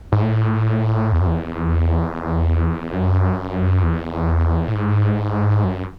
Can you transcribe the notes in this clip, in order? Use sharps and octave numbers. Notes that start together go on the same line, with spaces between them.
G#2
A2
E2
F#2
E2
F#2
E2
A2
G#2
F#2